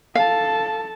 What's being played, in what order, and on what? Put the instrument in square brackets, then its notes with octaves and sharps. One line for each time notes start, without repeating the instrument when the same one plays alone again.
[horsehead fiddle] A4 A5 [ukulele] F5